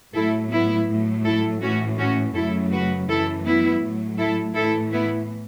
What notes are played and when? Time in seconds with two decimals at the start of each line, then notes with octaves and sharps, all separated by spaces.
0.15 A2 F#3 A3 E4 A4
0.51 B3 E4
0.88 A2 F#3 A3
1.24 E4 A4
1.62 A2 E3 A3 C#4 F#4
1.99 C#4 F#4
2.35 F#2 C#3 F#3 A3 E4 A4
2.72 F#4 B4
3.08 F#2 E3 A3 E4 A4
3.45 B3 E4
3.81 A2 F#3 A3
4.18 E4 A4
4.56 A2 E3 A3 E4 A4
4.92 B3 E4